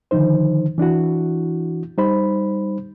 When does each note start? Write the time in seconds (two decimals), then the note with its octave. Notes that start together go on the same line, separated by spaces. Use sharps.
0.11 D3 D#3 F3 D#4 C5
0.78 E3 D4 E4 F#4
1.98 G3 D#4 C5 B5